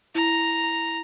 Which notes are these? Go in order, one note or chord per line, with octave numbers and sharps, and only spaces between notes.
E4 A#5